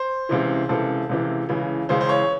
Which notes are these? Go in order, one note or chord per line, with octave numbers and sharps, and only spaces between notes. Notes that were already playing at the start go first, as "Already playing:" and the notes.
Already playing: C5
C#2 C3 E3
C#2 C3 E3 A4
C#2 C3 E3
C#2 C#3 E3
C#2 C#3 E3 C5
C5
C#5